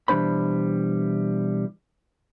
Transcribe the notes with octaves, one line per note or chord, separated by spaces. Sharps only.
B2 E3 G3 D4 C5 B5